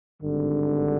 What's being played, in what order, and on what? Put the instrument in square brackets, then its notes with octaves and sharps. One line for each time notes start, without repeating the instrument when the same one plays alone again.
[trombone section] G#1 G2 D3